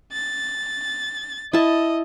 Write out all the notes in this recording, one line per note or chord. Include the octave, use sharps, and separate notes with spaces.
A6
E4 D#5 A5